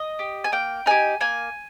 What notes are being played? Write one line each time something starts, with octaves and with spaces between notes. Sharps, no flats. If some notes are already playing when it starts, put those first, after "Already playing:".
Already playing: D#5
G4
G#5
A#3 G5
D#4 G4 G#5
A#3 G#5